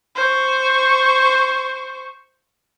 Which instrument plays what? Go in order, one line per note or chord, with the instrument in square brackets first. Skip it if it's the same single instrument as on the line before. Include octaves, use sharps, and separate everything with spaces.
[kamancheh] C5 C#6